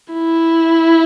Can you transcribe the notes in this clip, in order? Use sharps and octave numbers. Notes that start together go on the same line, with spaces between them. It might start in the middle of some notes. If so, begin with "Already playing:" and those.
E4